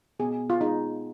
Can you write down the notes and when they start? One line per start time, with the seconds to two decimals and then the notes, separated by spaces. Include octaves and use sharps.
0.19 B2 G#4
0.50 F4
0.61 G#3 D#4